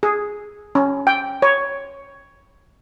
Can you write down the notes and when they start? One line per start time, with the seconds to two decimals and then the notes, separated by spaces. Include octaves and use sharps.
0.03 G#4
0.75 C#4
1.07 G5
1.42 C#5